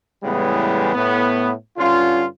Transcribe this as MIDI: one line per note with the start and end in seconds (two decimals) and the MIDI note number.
0.24 0.93 45
0.24 0.93 49
0.24 0.93 52
0.24 0.93 55
0.24 0.93 56
0.24 0.93 59
0.95 1.51 45
0.95 1.51 59
1.78 2.24 43
1.78 2.24 50
1.78 2.24 61
1.78 2.24 65